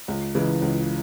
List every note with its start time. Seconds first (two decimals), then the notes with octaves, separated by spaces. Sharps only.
0.08 C#2
0.35 C#3 E3 G#3
0.62 C#2